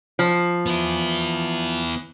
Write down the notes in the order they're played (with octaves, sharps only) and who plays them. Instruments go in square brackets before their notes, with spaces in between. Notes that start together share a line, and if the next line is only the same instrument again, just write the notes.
[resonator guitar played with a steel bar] F3
[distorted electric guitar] B3 E4